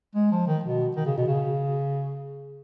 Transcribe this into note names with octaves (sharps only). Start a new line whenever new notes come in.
G#3
F3
D#3
B2
D#3
C#3
B2
C#3